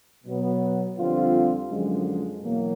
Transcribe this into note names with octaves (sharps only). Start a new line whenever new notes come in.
B2 F#3 B3
F2 D3 G3 C4 F4
F#2 D3 F3 G#3
E2 B2 F#3 A#3